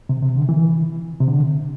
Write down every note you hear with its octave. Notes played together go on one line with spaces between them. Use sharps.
C3
C3
D3
E3
C3
D3